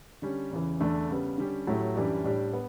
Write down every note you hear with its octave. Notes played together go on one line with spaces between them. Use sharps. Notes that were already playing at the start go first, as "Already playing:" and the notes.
D3 G3 C#4
E2 C#3 E3
E2 D3 A3 D4
C#3 G3 B3
D3 G3 C#4 G4
A2 F#3 A3 E4 G4
F#2 E3 G3 D4 G4
A2 G3 D4 G4
B3